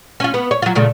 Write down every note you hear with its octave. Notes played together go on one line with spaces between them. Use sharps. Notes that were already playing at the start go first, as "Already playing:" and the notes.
C#4 F4
B3
C#5
F#3 F4
A#2 C#3 A3